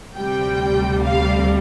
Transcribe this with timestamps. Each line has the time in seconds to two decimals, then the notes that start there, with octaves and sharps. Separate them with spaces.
0.17 D2 C3 G3 G5
1.03 F5